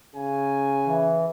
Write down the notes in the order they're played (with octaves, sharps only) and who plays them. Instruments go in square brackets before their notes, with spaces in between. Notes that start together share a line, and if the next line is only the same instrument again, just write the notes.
[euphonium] C#3 [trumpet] G#5
[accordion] E3